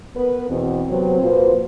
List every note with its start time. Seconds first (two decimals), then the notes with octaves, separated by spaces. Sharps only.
0.16 B3 A#4 B4
0.50 E2 B2 C4
0.89 C3 F#3 B3 C4
1.21 A#2 F3 F#4 B4 C5